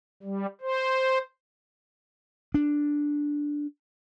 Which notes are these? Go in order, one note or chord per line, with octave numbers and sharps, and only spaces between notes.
G3
C5
D4